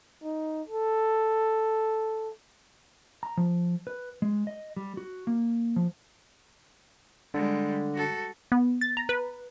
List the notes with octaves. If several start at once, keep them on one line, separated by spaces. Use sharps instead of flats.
D#4
A4
A#5
F3
B4
G#3
D#5
G3
F#4
A#3
F3
D3 G3 G#3
F#4 A4
B3
A6
A#5
B4